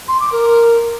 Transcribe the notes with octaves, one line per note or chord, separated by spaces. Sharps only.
C6
D6
A#4